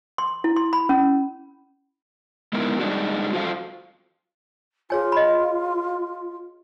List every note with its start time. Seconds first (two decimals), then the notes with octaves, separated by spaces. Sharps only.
0.18 C6
0.44 E4
0.56 C6
0.73 B5
0.89 C#4
2.53 G#3 B3 D#4 E4 A#4
2.80 G3 G#3 D4 D#4 F#4
3.33 F4 F#4 A4 C5 D#5 F5
4.90 F4 G#4 C#5 G#5
5.12 D#5 B5